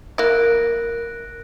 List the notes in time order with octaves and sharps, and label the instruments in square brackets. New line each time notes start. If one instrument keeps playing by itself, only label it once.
[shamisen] A#3 E4 [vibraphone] A#4 [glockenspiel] F#6 A#6 D7